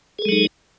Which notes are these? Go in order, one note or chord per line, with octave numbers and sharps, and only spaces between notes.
F#3 G#3 D#4 G#4 A4